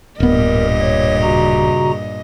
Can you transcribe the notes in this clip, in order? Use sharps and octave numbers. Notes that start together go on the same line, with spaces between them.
D1 G2 A#2 B3 A#4 D#5
C#5
C#3 F#4 A#5